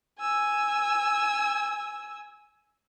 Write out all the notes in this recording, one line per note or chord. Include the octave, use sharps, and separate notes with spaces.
G#5 E6